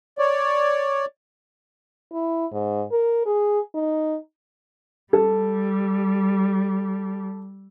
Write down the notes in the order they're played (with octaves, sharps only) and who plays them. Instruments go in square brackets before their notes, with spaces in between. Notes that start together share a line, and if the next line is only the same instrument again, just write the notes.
[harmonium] C#5 D5
[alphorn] E4
G#2
A#4
G#4
D#4
[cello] G3 [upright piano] A4